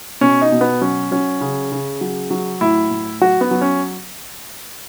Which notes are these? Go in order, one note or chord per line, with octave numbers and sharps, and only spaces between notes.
B2 C#4
D#4
B2
B3
F#3 C#4
F#3 C#4
C#3
C#3
F#3
F#3
A2 E4
A2
F#3 F#4
B3
F#3
C#4